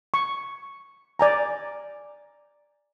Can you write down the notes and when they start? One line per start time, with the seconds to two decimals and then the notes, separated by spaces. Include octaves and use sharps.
0.14 C#6
1.19 D5 G#5 A#5